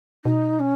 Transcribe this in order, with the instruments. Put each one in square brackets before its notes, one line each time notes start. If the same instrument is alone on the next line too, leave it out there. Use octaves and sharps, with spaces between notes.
[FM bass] B2 [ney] D#4
[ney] C#4